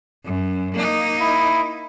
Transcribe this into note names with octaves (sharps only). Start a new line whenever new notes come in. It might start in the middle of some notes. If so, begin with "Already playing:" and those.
F#2
A#3 D#4
E4